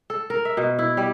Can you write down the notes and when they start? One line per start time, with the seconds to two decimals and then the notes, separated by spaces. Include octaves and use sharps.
0.10 A4
0.30 A#4
0.45 E5
0.57 B2
0.79 E4
0.97 G3